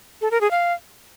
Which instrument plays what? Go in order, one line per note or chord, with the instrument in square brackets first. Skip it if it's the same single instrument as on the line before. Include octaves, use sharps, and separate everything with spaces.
[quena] A4
A#4
G#4
F5